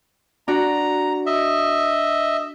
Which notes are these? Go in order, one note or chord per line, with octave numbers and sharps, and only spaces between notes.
D4 F#4 A#5
D#5 E5